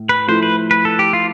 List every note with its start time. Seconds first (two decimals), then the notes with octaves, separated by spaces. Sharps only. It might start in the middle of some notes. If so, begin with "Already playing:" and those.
Already playing: A2
0.09 B4
0.27 F3 A3 E4 C5
0.43 B4
0.71 B4
0.85 A4
0.99 G4
1.13 F4